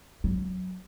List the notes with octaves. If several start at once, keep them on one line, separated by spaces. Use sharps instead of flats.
F#3